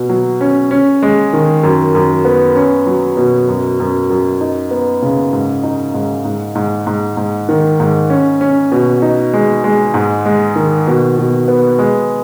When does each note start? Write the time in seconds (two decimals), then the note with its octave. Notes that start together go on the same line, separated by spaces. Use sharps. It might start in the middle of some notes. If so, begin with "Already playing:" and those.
Already playing: B2
0.09 F#3
0.41 C#4
0.71 C#4
1.03 G#3
1.33 D#3
1.63 F#2
1.95 F#2
2.25 B3
2.56 C#4
2.87 F#3
3.17 B2
3.48 F#2
3.80 F#2
4.10 F#2
4.41 D#4
4.71 B3
5.02 C#3
5.33 G#2
5.63 D#4
5.94 G#2
6.25 G#2
6.55 G#2
6.87 G#2
7.17 G#2
7.49 D#3
7.80 G#2
8.10 C#4
8.41 C#4
8.72 B2
9.02 D#4
9.33 G#3
9.64 G#3
9.94 G#2
10.26 G#3
10.56 D#3
10.87 B2
11.18 B2
11.48 B3
11.78 G#3